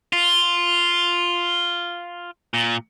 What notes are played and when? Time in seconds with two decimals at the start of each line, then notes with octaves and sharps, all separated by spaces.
0.13 F4
2.54 A#2